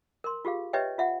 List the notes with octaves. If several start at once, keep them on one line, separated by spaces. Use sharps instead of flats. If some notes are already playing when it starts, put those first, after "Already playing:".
A#4 C6
F4 G4 G#4 F5
G4 B4 C#5 D#5 E5 G5
F4 E5 F#5